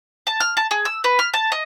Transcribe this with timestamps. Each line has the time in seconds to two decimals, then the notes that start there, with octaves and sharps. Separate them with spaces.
0.27 A5
0.40 F6
0.57 A5
0.71 G#4
0.85 E6
1.04 B4
1.19 F6
1.34 A5
1.52 D#5